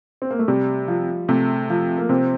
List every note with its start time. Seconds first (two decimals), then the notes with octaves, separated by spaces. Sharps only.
0.22 C4
0.31 A#3
0.39 A3
0.48 C3 G3
0.88 F3
1.29 C3 A3
1.70 F3
1.98 A#3
2.09 C3 C4